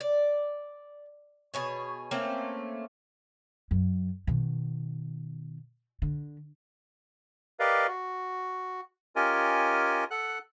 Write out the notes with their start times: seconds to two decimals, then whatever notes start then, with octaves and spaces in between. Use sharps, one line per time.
0.01 D5
1.54 B2 G#4 C#5
2.11 A3 A#3 C4 C#4
3.71 F#2
4.27 B2 D#3
6.02 D3
7.60 G4 A#4 B4 D5 D#5 F5
7.87 F#4
9.16 C#4 F4 G4 A#4 D#5 G#5
10.11 A4 F#5 F#6